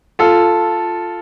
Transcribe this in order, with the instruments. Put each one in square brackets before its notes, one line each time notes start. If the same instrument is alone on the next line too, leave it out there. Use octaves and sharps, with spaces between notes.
[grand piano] F4 A4